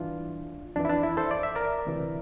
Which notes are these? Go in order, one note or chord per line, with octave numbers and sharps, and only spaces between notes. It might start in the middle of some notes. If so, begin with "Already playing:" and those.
Already playing: G2 E3 D4 F4
F2 E3 D4
E4
D4
E4
A4 C5
D5
E5
A#4 D5
D2 C3 E3